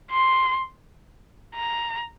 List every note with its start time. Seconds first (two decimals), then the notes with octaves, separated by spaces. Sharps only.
0.11 C6
1.56 A#5